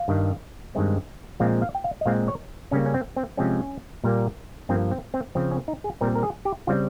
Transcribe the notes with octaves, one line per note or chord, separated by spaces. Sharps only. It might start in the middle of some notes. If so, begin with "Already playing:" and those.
Already playing: F5
G2 D#3 G3
G2 D#3 G#3 C4
A#2 F3 G#3 C4 F5
F5
G5
F5
D#5
A#2 G#3 C4 F5
C#5
C#3 G3 A#3 C#4
C#4
C4
C4
C3 F3 G#3 C4 C#4
A#2 G3 A#3
G2 F3 A#3 C4
C4
C4
C#3 F3 C4
C#4
D#4
G#4
A#2 G3 C4 A#4
A#4
G#4
G4
C#3 G3 C4 F4